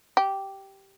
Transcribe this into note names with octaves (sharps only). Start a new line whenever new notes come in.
G4